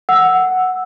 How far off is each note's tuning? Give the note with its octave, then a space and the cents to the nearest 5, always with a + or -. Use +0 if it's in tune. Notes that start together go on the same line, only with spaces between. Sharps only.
F#5 +0 E6 +0